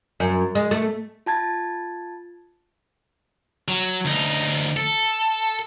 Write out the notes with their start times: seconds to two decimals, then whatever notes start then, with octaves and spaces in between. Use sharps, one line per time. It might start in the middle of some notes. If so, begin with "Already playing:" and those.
0.20 F#2
0.55 G#3
0.71 A3
1.26 F4 A5 G#6 A6
3.68 F#3
4.05 D2 D#4
4.77 A4